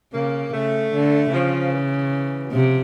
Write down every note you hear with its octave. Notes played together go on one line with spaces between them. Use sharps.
C#3 A#3
C#3 A3
D3
E3
C#3 F3
E3
F#3
C3 F3